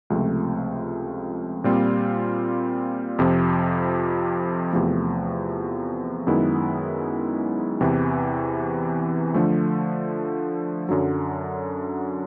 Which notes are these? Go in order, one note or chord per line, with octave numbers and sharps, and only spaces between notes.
C#2 C3 F3 A3 C4
A#2 G3 C4 F4
F2 C3 F3
E2 C3 F3 A3
F#2 D#3 G#3 B3 E4
E2 C3 E3
D3 F3 A3
F#2 D3 F#3